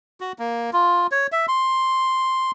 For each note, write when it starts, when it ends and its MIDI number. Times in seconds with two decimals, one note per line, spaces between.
0.21 0.32 66
0.39 0.70 58
0.73 1.07 65
1.12 1.27 73
1.32 1.46 76
1.48 2.51 84